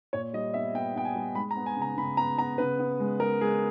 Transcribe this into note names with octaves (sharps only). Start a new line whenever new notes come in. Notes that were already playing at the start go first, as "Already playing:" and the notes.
A#2 C#5
G3 D#5
B3 E5
B3 G5
B3 G5
G#5
G3
G#3 B5
A#5
B3
G#5
C#3
A#5
C#3 B5
B3 A#5
B3 A#5
C#3 B4
B3
G#3
G#3 A#4
G#3 G#4